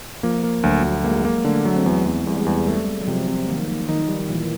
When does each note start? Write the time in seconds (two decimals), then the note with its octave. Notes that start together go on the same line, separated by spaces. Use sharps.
0.23 F3 A#3
0.43 A#3
0.63 D2 F#3
0.84 D2
1.04 G#3 A#3
1.25 A#3
1.44 D3 A3
1.65 F#3
1.76 C4
1.86 E2 B3
2.06 E2
2.26 E2 G3
2.35 G#3
2.45 E2 G3
2.66 G3 A3
2.87 A3
3.02 F#3
3.07 C3 F3
3.28 C3
3.48 D#3 A#3
3.68 A#3
3.89 D#3 D#4
4.09 G3
4.29 A#2 E3